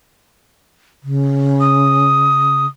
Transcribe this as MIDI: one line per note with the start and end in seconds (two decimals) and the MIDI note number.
1.04 2.66 49
1.60 2.66 87